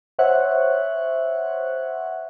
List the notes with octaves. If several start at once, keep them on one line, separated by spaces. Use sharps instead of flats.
C5 C#5 E5 F#5 F#6